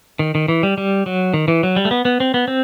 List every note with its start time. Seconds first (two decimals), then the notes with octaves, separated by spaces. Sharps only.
0.19 D#3
0.35 D#3
0.48 E3
0.63 G3
0.78 G3
1.06 F#3
1.34 D#3
1.48 E3
1.63 F#3
1.76 G3
1.85 A3
1.91 B3
2.05 B3
2.20 C4
2.34 B3
2.48 C4